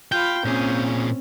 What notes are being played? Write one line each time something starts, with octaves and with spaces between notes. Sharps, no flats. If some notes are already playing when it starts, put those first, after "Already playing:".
F4 G5 B5 G6
A#2 C4 C#4 G#4